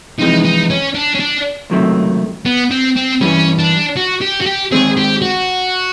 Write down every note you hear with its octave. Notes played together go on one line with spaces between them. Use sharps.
F2 C3 E3 G#3 D#4
D#4
C#4
D4
C#4
D4
C#2 C3 D#3 F#3 A3
B3
C4
C4
G2 E3 G3 C#4
D4
F#4
G4
F#4
G4
D#2 D#3 G#3 C4 G#4
G4
F#4